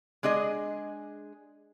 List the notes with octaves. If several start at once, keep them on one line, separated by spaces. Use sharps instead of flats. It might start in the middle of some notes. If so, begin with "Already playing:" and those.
G#3 D4 G#4 D#5